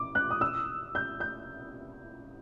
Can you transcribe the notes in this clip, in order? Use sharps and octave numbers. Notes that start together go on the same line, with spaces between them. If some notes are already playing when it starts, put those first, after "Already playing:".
Already playing: D6
F#6
D#6
E6
G6
G6